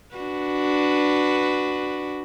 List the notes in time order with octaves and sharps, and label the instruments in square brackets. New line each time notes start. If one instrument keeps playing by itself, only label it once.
[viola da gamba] D4 F#4 B4